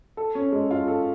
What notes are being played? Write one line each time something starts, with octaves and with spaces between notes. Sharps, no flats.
A4
C#4
G#3
F4
A4